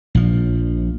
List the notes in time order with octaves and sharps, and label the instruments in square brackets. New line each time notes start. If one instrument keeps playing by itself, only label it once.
[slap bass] A#1 F3